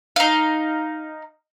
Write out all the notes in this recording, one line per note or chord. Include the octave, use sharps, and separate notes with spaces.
D#4 F5